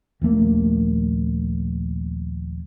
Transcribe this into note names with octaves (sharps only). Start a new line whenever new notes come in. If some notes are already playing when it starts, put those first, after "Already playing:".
D#1 A#1 A3 A#3